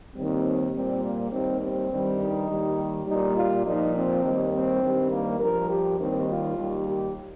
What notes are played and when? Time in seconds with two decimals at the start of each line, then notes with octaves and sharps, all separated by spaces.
0.14 D#2 D#3 G3 C4
0.73 A#2 G3 C4
1.03 A#3
1.31 D#2 D#3 G3 C4
1.60 C4
1.90 G2 D#3 G3
2.19 D#4
2.48 D#2 D#3 G3
3.06 A#2 G3 D#4
3.36 F4
3.65 A#2 F3 D#4
3.94 C4
4.23 D#2 D#3 G3
4.53 C4
4.82 G2 D#3 G3
5.11 A#3
5.40 G2 F3 A#4
5.70 G4
5.99 D#2 D#3 G3 C4
6.28 F4
6.57 D#2 D#3 G3
6.86 G4